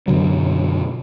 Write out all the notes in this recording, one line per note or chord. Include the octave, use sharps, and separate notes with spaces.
F#2 B2 D3 F#3